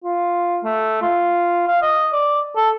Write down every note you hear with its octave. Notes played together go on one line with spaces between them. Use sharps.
F4
A3
F4
F5
D#5
D5
A4